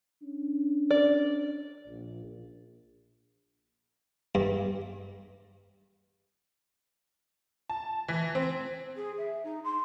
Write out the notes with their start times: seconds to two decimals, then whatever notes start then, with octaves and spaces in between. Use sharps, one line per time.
0.22 C#4 D4
0.91 D5
1.87 A#1
4.35 G2
7.70 A5
8.08 E3
8.35 C4
8.96 G#4
9.18 E5
9.44 D#4
9.64 C6